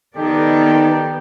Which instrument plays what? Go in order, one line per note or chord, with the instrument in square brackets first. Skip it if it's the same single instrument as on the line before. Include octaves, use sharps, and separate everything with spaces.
[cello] D#3 D5 [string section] B3 [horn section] D#4 A4 [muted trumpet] G4